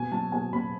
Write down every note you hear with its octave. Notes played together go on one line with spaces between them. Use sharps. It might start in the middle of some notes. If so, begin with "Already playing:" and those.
Already playing: B2 G#5
F#3 A5
B2 G#5
B2 B5